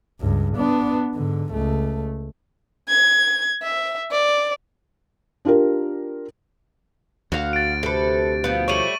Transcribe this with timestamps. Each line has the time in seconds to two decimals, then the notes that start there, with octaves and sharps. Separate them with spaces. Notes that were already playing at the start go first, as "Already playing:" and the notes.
0.21 C#2 G2
0.57 B3 D4
1.14 G#2 D3
1.53 C#2 A3
2.89 G#6
3.63 E5
4.11 D5
5.45 D4 F4 G4 A#4
7.32 D2 F#4 F5
7.53 A6 D7
7.83 C3 A4 B4
8.44 B2 F3 B3
8.68 G3 A3 C#5 C#6 D#7 F#7